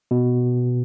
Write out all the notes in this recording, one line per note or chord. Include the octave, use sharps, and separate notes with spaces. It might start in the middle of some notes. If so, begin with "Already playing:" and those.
B2